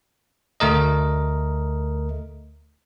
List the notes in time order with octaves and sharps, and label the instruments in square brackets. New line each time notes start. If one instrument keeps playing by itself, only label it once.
[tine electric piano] D2 A3 A#4 D#5